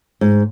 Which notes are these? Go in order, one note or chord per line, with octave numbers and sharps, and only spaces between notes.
G#2